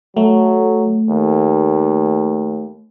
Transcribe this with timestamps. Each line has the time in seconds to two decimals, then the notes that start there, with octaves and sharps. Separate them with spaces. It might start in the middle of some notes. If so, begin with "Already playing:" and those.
0.17 F#3 A3
1.10 D#2